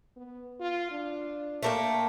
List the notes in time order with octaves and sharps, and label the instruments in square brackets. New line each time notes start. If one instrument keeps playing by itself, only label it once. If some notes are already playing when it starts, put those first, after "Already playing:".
[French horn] B3
F4
D4
[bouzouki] A3 A#3 G5